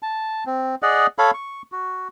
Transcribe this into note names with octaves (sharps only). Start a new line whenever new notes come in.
A5
C4
G#4 D5 D#5 F#5
A4 C#5 F5 B5
C#6
F#4